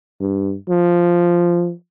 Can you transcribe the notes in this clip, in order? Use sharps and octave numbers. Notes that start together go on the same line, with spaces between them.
G2
F3